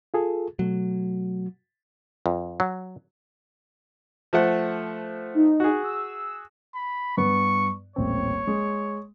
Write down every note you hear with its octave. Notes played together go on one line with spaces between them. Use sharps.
F4 G#4 A4
B2 F#3 A3
F2
F#3
F3 A3 F#5
D#4
F#4 G#4
E6
B5
G2 B3 B4 C#6
D#1 A1 C4 C#5
G#3